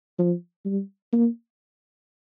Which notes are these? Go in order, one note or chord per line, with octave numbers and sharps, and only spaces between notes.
F3
G3
A#3